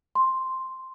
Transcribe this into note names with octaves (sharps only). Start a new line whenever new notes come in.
C6